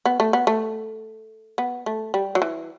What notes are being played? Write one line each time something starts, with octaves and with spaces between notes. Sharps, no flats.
B3
A3
B3
A3
B3
A3
G3
F#3
E3